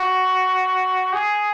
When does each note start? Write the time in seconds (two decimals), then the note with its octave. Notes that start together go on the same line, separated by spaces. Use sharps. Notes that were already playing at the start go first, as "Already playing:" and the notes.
Already playing: F#4
1.13 G#4